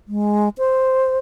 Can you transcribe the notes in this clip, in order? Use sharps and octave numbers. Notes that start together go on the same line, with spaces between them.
G#3
C5